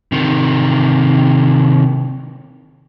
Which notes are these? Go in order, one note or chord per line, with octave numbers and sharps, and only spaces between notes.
C3 D#3